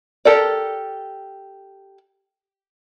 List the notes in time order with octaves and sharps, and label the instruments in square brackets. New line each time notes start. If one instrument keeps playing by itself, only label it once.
[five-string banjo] G4 A4 A#4 D5